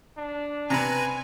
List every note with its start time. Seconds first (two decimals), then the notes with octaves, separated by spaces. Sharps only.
0.17 D4
0.70 C3 B4 G#5 A#5